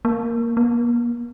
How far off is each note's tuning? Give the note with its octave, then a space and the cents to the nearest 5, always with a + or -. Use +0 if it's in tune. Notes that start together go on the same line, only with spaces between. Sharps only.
A#3 +0
A#3 +40